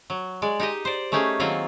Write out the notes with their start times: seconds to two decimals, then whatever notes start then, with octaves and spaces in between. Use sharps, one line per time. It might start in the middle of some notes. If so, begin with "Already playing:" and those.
0.10 F#3
0.42 G#3 D5
0.60 D#4 G4 D#5
0.85 C5 D5
1.12 A3 C#4 D#4 G4 G#4
1.40 D#3 F#3 A#3 C4 F4